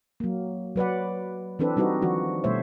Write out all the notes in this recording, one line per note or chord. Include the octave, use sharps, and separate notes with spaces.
F#3 A#3
F#3 B4 D5 F#5
E3 C4 D4 A4 B4
G3 C4 D#4 F#4 B4
D#3 F3 F#4
B2 G3 A3 C5 C#5 E5